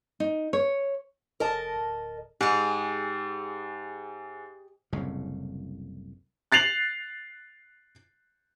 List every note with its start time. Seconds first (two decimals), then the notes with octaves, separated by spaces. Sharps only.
0.20 D#4
0.53 C#5
1.40 F1 A#4 D#5 A5
1.76 D1
2.41 G#2 G4 G#4
4.92 F#1 C2 A2 C#3
6.52 F#6 A6 C7 F7 F#7